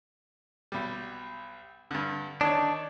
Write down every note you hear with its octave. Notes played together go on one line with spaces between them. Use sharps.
B1 G3
G2 D3
D#3 D4 D#4 C#5